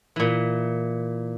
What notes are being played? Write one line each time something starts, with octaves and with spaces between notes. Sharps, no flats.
A#2 E3